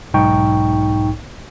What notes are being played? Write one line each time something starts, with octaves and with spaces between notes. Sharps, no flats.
B1 G#2 D#4 G5 C#6